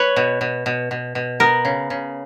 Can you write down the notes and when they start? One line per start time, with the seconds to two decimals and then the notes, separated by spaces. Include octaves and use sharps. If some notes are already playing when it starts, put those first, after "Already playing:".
Already playing: B4 C#5
0.16 B2
0.41 B2
0.66 B2
0.91 B2
1.15 B2
1.40 B3 A#4
1.65 C#3
1.90 C#3